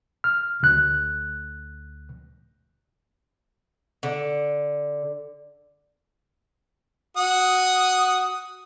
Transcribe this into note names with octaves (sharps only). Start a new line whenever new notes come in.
F6
D2 F#6
D3
F#4 D#6